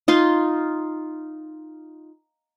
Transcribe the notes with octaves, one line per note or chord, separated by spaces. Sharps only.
D#4 F4 C6